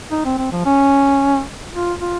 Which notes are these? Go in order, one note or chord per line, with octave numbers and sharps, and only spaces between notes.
D#4
C4
C4
F3
C#4
F4
F4